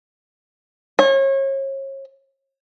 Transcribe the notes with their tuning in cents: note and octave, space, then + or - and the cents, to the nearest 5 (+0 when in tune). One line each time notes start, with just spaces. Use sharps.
C#5 -35